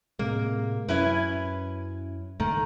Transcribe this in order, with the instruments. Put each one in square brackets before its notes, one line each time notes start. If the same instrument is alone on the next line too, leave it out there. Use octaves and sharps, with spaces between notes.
[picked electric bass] A2 C3 G#3 [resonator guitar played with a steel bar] A#3
[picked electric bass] F#2 [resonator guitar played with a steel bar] C#4 E4 B4
[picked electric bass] C#2 G#2 A3 [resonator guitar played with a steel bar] D#3